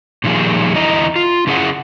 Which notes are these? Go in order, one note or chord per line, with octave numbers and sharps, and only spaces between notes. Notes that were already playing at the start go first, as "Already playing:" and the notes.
A#2 D#3 F3 G3 G#4
E2 D3 E4 D#5 A#5
F4
C#3 C#4 E4 G#4 D5 F#5